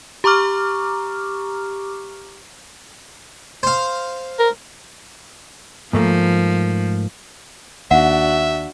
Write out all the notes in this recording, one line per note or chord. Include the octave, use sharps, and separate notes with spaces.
G4 A#5 C#6 D6 F6
C5 F5
A#4
G#2 F3 A3 A#3
D#2 D4 F#4 E5 F#5